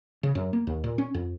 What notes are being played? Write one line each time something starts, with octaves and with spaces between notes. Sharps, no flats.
C#3
F#2
A#3
D#2
A#2
C#4
F2